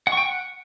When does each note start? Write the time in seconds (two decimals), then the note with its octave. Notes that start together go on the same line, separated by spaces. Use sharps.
0.07 F#5
0.12 C#6
0.17 G5
0.23 F#5